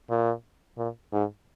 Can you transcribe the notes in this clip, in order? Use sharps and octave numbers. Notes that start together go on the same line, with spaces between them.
A#2
A#2
G#2